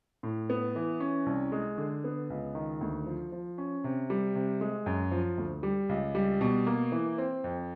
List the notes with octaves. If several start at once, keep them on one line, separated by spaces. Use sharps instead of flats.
A2
B3
E3
C#4
C2
G#3
D3
B3
C#2
D#3
D2
F3
F3
C#4
C3
G3
C3
G#3
F#2
F3
D2
G3
C#2
G3
B2
A#3
E3
C4
F2